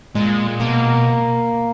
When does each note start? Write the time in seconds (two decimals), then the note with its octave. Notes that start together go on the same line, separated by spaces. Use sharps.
0.15 A#2 G#3
0.60 B2 A#3